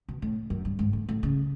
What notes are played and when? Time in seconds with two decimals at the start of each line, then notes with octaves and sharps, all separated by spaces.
0.08 B2
0.22 A2
0.50 F#2
0.65 G2
0.79 G#2
0.93 A2
1.09 A2
1.23 C#3